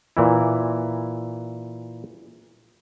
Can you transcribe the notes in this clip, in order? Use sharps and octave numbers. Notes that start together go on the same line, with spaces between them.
A#2 E3 E4